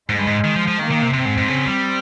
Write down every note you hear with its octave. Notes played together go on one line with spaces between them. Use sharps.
G#2 G#3
G2
G#2
D#3
F3
F3
D#3 A#3
D#3
C3
C3 C4
G#2
G#2
C#3
G3